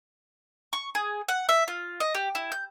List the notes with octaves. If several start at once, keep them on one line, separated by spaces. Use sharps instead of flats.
C#6
G#4
F#5
E5
F4
D#5
G4
E4
G6